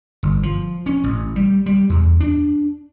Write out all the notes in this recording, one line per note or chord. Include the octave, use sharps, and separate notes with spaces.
G1
F3
C#4
A1
G3
G3
E2
D4